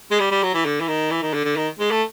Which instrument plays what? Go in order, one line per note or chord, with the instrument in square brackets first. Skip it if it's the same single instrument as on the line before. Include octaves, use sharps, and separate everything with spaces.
[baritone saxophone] G#3
G3
G3
F#3
E3
D3
E3
D#3
E3
D#3
D3
D3
D#3
G#3
A3